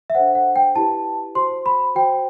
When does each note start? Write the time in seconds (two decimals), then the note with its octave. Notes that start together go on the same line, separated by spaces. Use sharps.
0.10 E5
0.15 D4 A4 C5 F#5
0.35 F#5
0.56 G5
0.76 E4 G4 B4 A5
1.35 F#4 C5 C6
1.66 B5
1.95 F#4 C5 G5